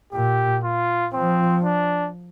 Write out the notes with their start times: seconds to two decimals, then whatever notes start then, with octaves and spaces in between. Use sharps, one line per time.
0.13 A#2 G4
0.63 F4
1.13 F3 C4
1.64 D4